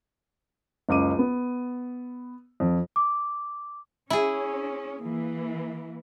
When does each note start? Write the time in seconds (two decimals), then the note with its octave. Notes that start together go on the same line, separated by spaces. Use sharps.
0.89 F#1 C#2 D6 D#7
1.19 B3
2.60 F2
2.96 D6
4.10 C#4 E4 G#4
5.00 E3 A#3